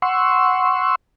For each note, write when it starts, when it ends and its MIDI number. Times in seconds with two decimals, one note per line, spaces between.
0.02 0.95 78
0.02 0.95 84
0.02 0.95 85
0.02 0.95 88